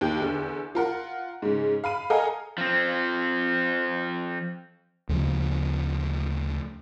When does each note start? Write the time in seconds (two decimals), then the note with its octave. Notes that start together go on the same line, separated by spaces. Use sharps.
0.01 D#2 G4 G6
0.20 E2 D3
0.75 F4 A#4 F#5
1.42 G#2 C#3
1.84 F5 B5 D#7
2.10 A4 D#5 F5 F#5 G#5 A#5
2.58 F3 C4
5.09 D2 C#3 F3